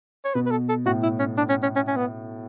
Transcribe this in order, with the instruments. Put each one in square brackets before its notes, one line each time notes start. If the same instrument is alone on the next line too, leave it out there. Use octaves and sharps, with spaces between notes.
[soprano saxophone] C#5
[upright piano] B2 [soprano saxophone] B4
[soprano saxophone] B4
A4
A4
[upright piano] A2 [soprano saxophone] F#4
[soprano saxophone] E4
C#4
D4
C#4
C#4
C#4
C#4
B3